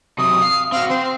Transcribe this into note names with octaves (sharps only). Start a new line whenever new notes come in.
C3 F#3 D#6
F5
C4 F#4 F5
C4 C5